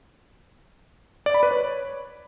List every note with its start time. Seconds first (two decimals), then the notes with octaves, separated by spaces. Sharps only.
1.26 D5
1.34 B5
1.43 B4
1.51 C#5